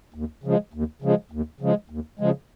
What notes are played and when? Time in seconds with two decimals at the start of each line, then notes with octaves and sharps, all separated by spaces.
0.14 D#2
0.44 C#3 F3 G#3
0.74 D#2
1.02 C#3 F3 G#3
1.31 D#2
1.61 C#3 F3 G#3
1.90 D#2
2.19 C#3 F3 G#3